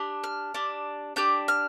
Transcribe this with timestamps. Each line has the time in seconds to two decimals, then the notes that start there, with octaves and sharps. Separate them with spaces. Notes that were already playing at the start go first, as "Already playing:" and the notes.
Already playing: D4 G4
0.24 F6
0.54 D4 G4
1.16 D4 G4 G6
1.48 F6